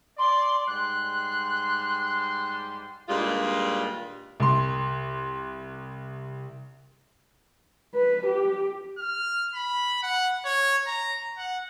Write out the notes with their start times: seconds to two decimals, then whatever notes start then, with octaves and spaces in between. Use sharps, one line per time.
0.18 D5 C6
0.67 G#2 G3 C6 F#6
3.09 G2 A#2 D#3 G3 G#3 F4
4.40 C2 C6
7.95 B4
8.26 G4
8.98 F6
9.55 B5
10.03 F#5
10.45 C#5
10.87 A#5
11.38 F#5